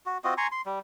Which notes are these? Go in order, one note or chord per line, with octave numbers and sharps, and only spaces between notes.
F#4
C4 F4 F#4 D#5
G#5 A#5 C6 C#6
C6
G3